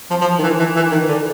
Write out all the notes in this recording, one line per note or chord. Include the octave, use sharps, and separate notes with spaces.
F3
F3
D#3
E3
E3
E3
D#3
D3